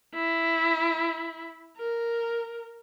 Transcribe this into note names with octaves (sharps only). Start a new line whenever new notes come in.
E4
A#4